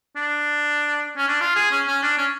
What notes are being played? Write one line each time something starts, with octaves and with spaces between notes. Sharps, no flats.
D4
C#4
D4
F4
G#4
C#4
C#4
D4
C#4